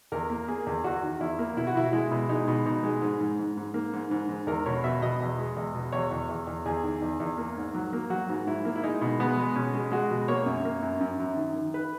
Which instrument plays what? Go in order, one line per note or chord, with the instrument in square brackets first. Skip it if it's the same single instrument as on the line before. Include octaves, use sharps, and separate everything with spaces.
[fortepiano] E2 A#4
A#3
A#3 G#4
E2
E2 F#4
D#3
E2 E4
A#3
B2 E4
F#4
B2 E4
G#3 E4
B2
G#3 D#4
B2
B2 D#4
G#3
G#2
G#2
G#2
G#2
A#3
G#2
G#2
G#2
E2 A#4
B2 C#5
B2 E5
B2 D#5
E2
G#3
E2
B2
E2 C#5
E2
E2
E2
E2 G#4
D#3
E2
E2
A#3
G#2
F#3
A#3
F#3 F#4
G#2
G#2 E4
A#3
E4
G#3 D#4
B2
G#3 B3
G#3
B2 C#4
G#3
G#3 F#4
B2
A#3 C#5
F#2
A#3
F#2
F#2
F#2
D#3
D#3
B4